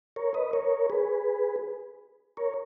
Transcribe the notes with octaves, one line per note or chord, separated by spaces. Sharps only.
A#4 C#5
B4 D#5
A#4 C#5
G#4 B4
A#4 C#5